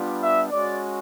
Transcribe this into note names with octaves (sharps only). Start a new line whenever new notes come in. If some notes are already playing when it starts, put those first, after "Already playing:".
Already playing: G3 B3 D4 F4
E5
G#3 C#4 F#4 D5